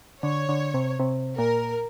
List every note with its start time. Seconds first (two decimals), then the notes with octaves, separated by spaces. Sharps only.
0.22 D3 C#5
0.49 D3
0.74 C3
0.99 C3
1.38 A#2 A#4